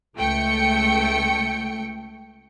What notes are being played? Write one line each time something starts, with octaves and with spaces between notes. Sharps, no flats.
C#2 A3 G5 C#7